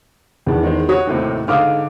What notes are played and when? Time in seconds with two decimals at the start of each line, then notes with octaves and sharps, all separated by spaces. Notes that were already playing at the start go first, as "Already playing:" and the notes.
0.46 E2 D#3 D4
0.63 D#3 G#3 C5
0.89 F#4 C#5 D#6
1.07 D#2 A2 C3
1.48 G#2 D3 F5 D6 D#6 F6